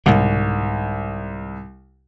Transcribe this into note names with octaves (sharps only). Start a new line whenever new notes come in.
C2 G#2 B2 D3